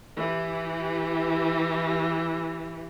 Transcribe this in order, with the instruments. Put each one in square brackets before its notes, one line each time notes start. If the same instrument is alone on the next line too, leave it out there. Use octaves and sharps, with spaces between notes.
[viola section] E3 G4